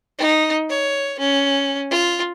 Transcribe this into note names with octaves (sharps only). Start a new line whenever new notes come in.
D#4
C#5
C#4
F4